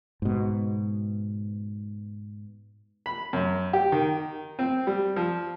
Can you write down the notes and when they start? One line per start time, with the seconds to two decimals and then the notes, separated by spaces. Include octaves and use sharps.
0.22 G#2 B2
3.06 B5
3.33 F#2
3.73 G4
3.92 D#3
4.59 C4
4.87 G3
5.16 F3